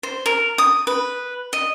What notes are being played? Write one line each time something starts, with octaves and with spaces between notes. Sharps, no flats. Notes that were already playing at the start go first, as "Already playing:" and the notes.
C5
A#4
D#6
B4
D#5